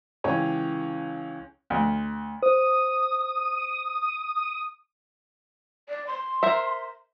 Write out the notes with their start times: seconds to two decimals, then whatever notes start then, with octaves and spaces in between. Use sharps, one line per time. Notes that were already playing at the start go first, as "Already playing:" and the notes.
0.24 C#2 E3 G4 C#5 G#5
1.70 D2
2.42 C5 D#6
5.89 D5
6.07 C6
6.43 A#4 C5 E5